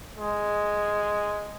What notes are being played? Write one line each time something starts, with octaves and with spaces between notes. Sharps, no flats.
G#3